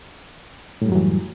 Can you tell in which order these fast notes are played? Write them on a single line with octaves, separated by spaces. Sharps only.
A2 G3 F#2 F#3 E3